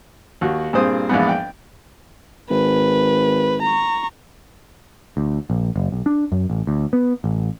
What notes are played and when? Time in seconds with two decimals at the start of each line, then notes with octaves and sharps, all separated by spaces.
0.41 D#2 F#4
0.73 G2 A#2 C4 G#4 C5 D#6
1.09 A#1 E2 G#2 B3
1.29 G5
2.50 G#1 B4
3.62 A#5 C#6
5.17 D2
5.50 A#1
5.76 F#1
5.92 B1
6.06 D4
6.32 F#2
6.50 A1
6.67 D2
6.93 B3
7.24 A1